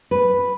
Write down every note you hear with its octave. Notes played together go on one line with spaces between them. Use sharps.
B4